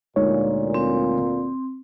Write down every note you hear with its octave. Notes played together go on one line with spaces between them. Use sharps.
D2 A#2 G#3 D#4 C#5
C4